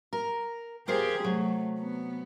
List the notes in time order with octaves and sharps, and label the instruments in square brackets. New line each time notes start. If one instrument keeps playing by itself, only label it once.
[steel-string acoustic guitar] A#4
[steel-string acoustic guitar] F4 A#4 C5 [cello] G4 G#4
[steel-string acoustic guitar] C3 F#3 [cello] A3
[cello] B3